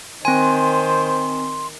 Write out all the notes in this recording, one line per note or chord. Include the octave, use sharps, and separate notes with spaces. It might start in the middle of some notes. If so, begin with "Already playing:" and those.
D#3 C4 C5 G#5 C6